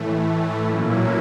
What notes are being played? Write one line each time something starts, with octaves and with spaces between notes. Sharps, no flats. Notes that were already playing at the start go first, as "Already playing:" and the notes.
Already playing: A2 E3 A3
A#2 F#3 A#3 C#4 E4